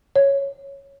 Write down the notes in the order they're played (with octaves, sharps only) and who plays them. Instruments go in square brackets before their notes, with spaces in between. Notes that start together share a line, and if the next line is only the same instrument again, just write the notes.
[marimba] C#5